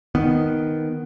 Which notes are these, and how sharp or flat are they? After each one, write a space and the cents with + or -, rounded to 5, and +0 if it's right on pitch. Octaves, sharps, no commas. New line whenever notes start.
D#3 +0 B3 +0